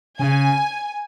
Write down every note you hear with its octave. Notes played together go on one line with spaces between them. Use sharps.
C#3 G#5